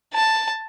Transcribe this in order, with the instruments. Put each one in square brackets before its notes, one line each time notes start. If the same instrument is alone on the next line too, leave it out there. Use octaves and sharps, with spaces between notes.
[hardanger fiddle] A5